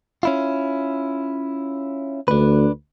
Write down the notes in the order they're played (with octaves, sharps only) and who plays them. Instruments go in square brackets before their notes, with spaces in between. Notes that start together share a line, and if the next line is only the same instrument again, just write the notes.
[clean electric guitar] C#4 E4 F4
[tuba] D2 [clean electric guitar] D4 B4